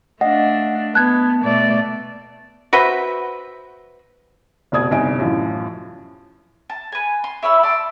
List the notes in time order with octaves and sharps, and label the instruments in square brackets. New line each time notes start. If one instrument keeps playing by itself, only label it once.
[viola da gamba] A3 D4 [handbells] D#5 F5 [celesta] F#5
[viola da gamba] B3 [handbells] A5 [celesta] F#6 G#6
[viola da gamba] B2 A3 D5
[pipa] F#4 B4 C5 E5
[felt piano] F1 B2 D5 D#6 G#6
G1 C2 D#4 D#5 G#5 D7
F#2 A2 E3 F3
[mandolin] A5
B4 G#5
C6
E4 C#5 B5 E6
D5 A5 B5 C6